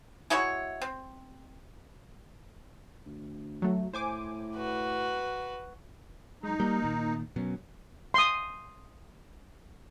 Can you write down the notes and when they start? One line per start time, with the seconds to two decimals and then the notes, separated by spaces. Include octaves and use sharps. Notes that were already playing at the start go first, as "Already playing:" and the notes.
0.30 G#3 E4 F#4 C#5
0.82 C4
3.06 D2
3.62 F#3 A3
3.93 A2 C5 G#5 D6
4.56 F#4 B4
6.43 F#2 G#3 D#4
6.60 G3 A#3
6.82 A#2 D#3
7.36 B2 F#3 C#4
8.14 C6 D#6